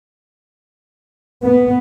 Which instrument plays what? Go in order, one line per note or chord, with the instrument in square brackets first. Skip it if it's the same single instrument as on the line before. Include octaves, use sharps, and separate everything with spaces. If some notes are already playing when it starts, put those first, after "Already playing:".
[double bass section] B3